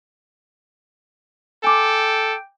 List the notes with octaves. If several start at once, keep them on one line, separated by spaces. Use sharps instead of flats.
A4 G5 G#5 D6